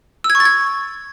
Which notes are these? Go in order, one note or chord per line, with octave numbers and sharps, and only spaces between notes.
E6
G#6
C#6
A6
G#6